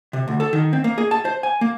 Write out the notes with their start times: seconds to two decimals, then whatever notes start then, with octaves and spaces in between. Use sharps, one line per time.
0.13 C3
0.28 D2
0.40 A4
0.53 D#3
0.73 C4
0.84 A#3
0.98 G#4
1.11 A5
1.25 C5
1.43 G#5
1.61 A#3